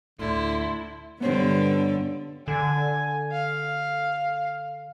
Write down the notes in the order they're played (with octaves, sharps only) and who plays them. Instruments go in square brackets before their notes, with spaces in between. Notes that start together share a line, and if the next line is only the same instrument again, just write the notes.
[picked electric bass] D2 A2 [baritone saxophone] D3 [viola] E4 [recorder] C6
[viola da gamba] G2 D3 G3 [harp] B3 C#4 C5
[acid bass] D3 [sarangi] G#5
[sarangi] F5